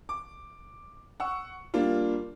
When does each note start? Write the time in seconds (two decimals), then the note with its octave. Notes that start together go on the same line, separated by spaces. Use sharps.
0.09 D6
1.20 F#5 C#6 E6
1.74 G3 A#3 D4 F4